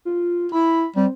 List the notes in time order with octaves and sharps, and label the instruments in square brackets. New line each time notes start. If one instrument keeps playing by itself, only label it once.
[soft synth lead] F4
[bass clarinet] E4 [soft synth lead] B5
[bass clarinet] G3 [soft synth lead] C4